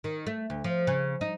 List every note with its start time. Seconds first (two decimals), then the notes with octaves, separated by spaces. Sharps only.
0.04 D#3
0.27 A3
0.50 D2
0.64 F3
0.87 C#3
1.21 D#4